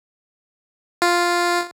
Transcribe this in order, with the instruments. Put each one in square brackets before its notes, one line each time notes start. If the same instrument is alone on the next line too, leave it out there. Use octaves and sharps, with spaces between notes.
[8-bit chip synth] F4